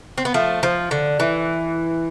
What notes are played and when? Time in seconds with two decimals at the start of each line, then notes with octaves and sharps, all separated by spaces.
0.18 C4
0.25 B3
0.34 F3 A3
0.63 F3
0.91 D3
1.20 E3